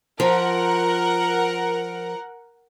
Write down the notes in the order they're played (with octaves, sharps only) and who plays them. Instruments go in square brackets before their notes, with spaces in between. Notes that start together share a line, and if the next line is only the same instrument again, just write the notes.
[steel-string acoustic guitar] F3 [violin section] A#4 F#5